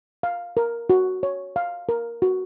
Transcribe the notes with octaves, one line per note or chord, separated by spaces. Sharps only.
F5
A#4
F#4
C#5
F5
A#4
F#4